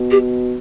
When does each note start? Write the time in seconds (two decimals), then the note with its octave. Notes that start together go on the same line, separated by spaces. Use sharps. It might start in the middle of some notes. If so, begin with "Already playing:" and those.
Already playing: B2
0.11 G4